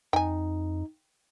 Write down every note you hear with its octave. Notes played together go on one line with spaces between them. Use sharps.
F2 D#4 G5 G#5